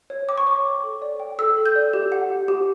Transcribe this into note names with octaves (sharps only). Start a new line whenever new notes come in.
C#5
G5 D6
C#6
C#5 D6
C#5
A4
D5
G5
A4 E6
A4
G6
D5
G4
F#5
G4
G4